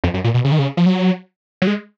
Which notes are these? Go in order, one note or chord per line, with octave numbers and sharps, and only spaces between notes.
F2
F#2
A#2
B2
C#3
D#3
C#3
F3
F#3
F#3
G#3